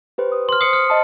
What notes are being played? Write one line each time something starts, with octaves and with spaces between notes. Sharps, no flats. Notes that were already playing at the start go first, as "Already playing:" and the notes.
G4 B4 C5
D#6
C6 F6
C5 D#6 C7 C#7
D#6 F6
D#5 A5 D#6